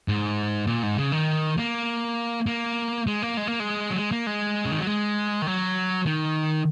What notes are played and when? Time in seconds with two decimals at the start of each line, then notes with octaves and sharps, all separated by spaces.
0.08 G#2
0.67 A#2
0.83 G#2
0.98 C#3
1.12 D#3
1.58 A#3
2.46 A#3
3.07 G#3
3.22 A#3
3.37 G#3
3.47 A#3
3.60 G#3
3.90 F#3
3.96 G#3
4.12 A#3
4.27 G#3
4.65 C#3
4.71 D#3
4.79 F#3
4.87 G#3
5.42 D#3
5.47 F#3
6.06 D#3